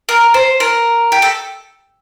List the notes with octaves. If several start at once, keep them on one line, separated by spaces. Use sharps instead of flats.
A#4
C5
A#4
G4
A4